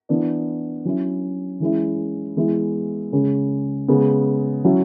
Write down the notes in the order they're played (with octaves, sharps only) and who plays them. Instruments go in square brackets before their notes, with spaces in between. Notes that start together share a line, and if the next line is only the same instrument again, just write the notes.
[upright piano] E3 B3 D4
F#3 C#4 E4
E3 G#3 C#4 E4
E3 G#3 B3 E4
C#3 G#3 C#4
C#3 G#3 B3
F#3 C#4 E4